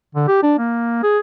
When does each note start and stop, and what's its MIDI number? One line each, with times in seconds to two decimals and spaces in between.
0.15 0.27 50
0.28 0.42 67
0.43 0.56 62
0.59 0.98 58
1.03 1.19 68